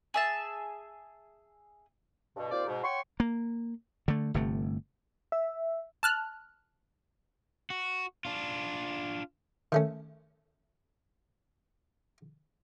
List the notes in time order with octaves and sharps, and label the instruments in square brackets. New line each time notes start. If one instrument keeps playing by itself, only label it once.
[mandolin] G#4 E5 A5
[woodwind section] G2 B2
D#2 C4 F4 C5 D5
G#2 B2
C#5 F#5 G5 C6 C#6
[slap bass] A#3
D3 A3
G1 C3 A3
[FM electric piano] E5
[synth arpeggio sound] A5 F6 F#6
[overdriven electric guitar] F#4
D4 F4
[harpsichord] D#3 A3 C#4